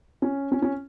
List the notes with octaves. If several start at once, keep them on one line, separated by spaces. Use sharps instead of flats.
C#4
C#4
C#4